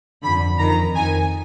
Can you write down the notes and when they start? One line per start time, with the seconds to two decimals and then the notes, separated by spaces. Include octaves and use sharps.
0.23 F2 D3 B5
0.58 F2 D#3 A#5
0.94 F2 D#3 G#5